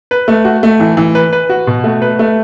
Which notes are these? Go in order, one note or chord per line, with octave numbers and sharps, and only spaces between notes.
B4
A3
F#4
A3
E3
E3
B4
B4
F#4
B2
A3
B4
A3